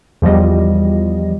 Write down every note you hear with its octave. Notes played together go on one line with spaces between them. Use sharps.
E2 F3 G3 D#5